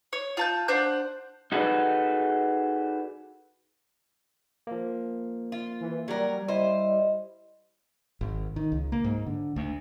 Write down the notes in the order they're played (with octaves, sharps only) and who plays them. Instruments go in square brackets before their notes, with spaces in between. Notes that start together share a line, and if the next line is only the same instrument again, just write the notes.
[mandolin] C#5
F4 A5 G6
D4 C5 F#5 G6
[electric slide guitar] D#4 F#4 G#4 A4 B4 D5
[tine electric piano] F3 A#3
[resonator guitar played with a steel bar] F4
[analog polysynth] E3
[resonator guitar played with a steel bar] F#3 A#4 [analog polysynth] G3
[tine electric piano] E4 [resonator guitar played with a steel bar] C5 [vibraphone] D#5
[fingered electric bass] G#1
D#3
C#2
A#3
G#2
D3
D2